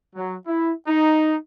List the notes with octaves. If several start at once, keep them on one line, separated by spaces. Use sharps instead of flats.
F#3
E4
D#4